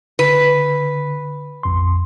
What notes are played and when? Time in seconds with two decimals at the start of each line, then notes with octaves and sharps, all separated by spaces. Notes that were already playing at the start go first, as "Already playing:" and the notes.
0.19 D3 B4
1.63 A#1 F2 C6